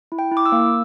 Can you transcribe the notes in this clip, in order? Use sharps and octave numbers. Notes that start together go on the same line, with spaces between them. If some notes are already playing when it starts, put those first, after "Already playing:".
E4
G5
E4
D6
E6
A#3